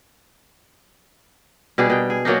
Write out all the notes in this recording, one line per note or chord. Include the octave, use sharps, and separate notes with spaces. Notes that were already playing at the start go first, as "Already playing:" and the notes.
B2 G3 D4 G#4
B2 G5
G#4
F#3 A#3 D4 D#4